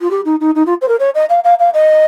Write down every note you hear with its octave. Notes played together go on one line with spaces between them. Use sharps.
F4
G4
D#4
D#4
D#4
F4
C5
A#4
C#5
D#5
F5
F5
F5
D#5